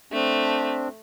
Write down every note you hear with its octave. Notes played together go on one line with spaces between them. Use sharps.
A3 C4 D4